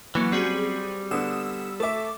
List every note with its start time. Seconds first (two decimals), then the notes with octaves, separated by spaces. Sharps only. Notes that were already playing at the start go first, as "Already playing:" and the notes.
0.15 E3 F#3 A#3 C#4
0.32 G3 C4 F#4 G#4
1.11 D3 B3 D#6 E6 E7
1.80 A3 A4 E5 D6